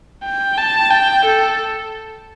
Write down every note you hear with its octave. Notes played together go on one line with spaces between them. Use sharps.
G5
A5
G5
A4